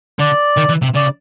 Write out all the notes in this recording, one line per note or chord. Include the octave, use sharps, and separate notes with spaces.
D3 D5
D#3
E3
C3
C#3 D5